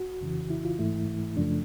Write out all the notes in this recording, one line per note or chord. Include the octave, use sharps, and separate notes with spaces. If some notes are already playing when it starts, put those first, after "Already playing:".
Already playing: F#4
F2 C#3 E3
E4
F4
G#2 E3 A3 E4
F#2 C#3 F3 A3 D4